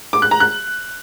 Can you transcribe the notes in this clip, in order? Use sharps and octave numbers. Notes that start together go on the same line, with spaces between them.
D6
F#6
A#5
F#6